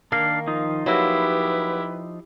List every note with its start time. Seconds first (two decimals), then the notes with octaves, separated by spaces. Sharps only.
0.12 D#3 A#3 D4 F5
0.47 F3 D#4 F4
0.86 F#3 A#3 E4 G4 B4